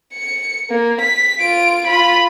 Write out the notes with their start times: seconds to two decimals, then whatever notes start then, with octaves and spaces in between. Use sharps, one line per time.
0.14 C#7
0.70 A#3
1.01 B6
1.40 F4 D7
1.86 F4 B5